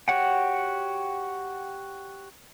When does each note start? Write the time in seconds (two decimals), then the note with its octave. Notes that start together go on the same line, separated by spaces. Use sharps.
0.08 F#4 G4 C#5 F#5 G5